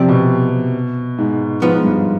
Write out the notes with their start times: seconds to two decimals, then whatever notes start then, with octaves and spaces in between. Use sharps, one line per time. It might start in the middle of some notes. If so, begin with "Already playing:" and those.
Already playing: C3 F3 C4 G4 D5
0.09 B2
1.18 G#2
1.62 G#2 F3 B3 F4 B4
1.74 G#2
1.84 G2